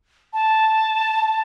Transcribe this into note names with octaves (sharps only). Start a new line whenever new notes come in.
A5